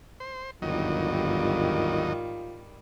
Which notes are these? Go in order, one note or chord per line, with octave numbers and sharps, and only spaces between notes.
C5
G1 D#2 G#2 D#3 F#3 G3 F4 D#5